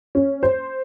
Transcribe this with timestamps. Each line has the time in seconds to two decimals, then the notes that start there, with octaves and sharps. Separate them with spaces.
0.15 C#4
0.43 C5